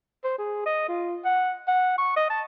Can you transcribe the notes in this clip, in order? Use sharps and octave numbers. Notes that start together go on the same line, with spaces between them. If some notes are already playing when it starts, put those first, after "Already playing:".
C5
G#4
D#5
F4
F#5
F#5
C#6
D#5
A5